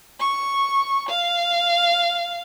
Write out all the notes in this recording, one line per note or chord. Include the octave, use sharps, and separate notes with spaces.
C#6
F5